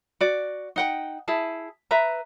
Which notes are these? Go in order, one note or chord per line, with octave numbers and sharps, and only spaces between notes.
F#4 D5
D#4 F#5 G5
E4 G#4 A5
B4 E5 A#5